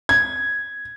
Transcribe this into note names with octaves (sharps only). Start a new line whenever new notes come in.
G#6